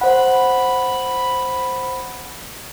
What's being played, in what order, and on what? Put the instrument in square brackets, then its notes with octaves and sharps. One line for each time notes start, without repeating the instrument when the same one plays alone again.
[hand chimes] C5 F#5 [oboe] B5